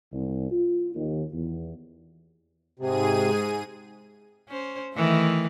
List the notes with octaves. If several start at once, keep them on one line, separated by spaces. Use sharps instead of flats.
C2
F4
D#2
E2
G#2 C3 G#4 D#7
C#4 C5
D#3 E3 A3